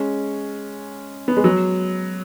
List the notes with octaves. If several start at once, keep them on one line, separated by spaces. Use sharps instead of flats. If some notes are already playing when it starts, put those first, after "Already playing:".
Already playing: G#3 C#4
B3
G#3
F#3